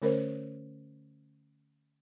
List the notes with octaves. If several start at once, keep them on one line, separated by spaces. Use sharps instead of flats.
D3 A3 C#4 A#4 C5 C#5